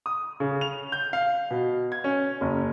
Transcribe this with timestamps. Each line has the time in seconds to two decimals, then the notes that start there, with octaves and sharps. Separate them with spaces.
0.06 D#6
0.40 C#3
0.61 F7
0.92 G6
1.13 F5
1.50 B2
1.92 G#6
2.04 C#4
2.41 F#1